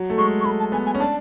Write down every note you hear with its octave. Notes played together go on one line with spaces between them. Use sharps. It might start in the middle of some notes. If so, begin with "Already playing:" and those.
Already playing: F#3
A3
G#3 C#6
C#6
A3 B5
A5
B3 G#5
G#5
C#4
D4 A5